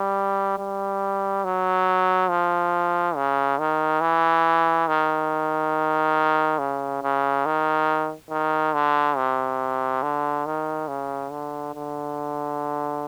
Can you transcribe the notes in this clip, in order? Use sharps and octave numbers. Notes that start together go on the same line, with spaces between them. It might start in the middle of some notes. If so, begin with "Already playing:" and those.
Already playing: G3
G3
F#3
F3
C#3
D#3
E3
D#3
C#3
C#3
D#3
D#3
D3
C3
D3
D#3
C#3
D3
D3